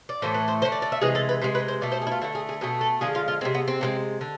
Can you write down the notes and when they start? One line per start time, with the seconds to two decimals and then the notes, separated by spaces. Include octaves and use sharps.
0.09 D5
0.22 A2 E3 A3 C5
0.34 B4
0.48 C5
0.62 D3 A3 C5
0.72 D5
0.82 D5
0.92 E5
1.01 C3 E3 G#3 G#4
1.15 A4
1.29 B4
1.42 C3 G#3 C5
1.55 B4
1.68 C5
1.81 B2 A3 D5
1.92 C5
2.02 G#4
2.07 E4
2.12 F4
2.21 D3 A3 E4
2.35 G#4
2.49 G#4
2.61 B2 A3 G#4
2.81 A4
3.01 D3 F3 G#3 G#4
3.15 F4
3.28 F4
3.41 G#3 C4
3.45 C3
3.54 B3
3.68 C4
3.81 C3 E3 G#3
4.21 D3